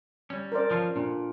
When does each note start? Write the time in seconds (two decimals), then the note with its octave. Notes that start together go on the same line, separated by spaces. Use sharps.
0.30 G3 C#4
0.52 A#4 C5 D5
0.70 F3 C#4 F4 A5
0.96 A#2 D4